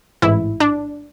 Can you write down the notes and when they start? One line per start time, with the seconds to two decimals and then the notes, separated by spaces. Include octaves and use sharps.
0.22 A1 G#2 E3 E4
0.60 D4